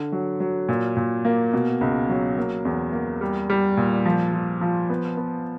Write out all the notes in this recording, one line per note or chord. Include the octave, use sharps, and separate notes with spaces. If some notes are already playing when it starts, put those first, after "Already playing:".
Already playing: D3
F#3
F#3
A#2
A#2
A#3
B2
C#2
F#3
A#3
E2
A#3
G3
G3
A#2
F3
F3
F3
B3
B3